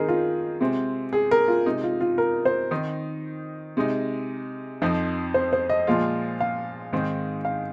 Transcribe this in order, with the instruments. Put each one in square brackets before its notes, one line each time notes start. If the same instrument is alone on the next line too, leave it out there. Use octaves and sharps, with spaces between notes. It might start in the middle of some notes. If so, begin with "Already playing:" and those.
Already playing: [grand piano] D#3 C4 D#4 [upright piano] G#4 A#4 D#5
[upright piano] F4
[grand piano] C3 G#3 C4
[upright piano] G#4
A#4
F4
[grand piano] C3 G#3 D#4
[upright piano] F4
F4
A#4
C5
[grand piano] D#3 C4 D#4
C3 G#3 D#4
F2 F3 C4 D#4
[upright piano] C5
C5
D#5
[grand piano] A#2 F3 G#3 F4
[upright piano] F5
[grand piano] G#2 D#3 C4 D#4
[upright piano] F5